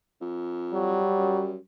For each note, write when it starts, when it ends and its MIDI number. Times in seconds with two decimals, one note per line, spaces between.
0.21 1.01 41
0.73 1.44 54
0.73 1.57 55
1.18 1.57 42